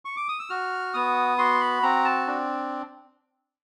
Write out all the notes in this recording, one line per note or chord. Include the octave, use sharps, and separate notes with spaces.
C#6
D6
D#6
E6
F#4 F6
B3 D#6
F#4 C6
B5
C4 A#5
A5
D4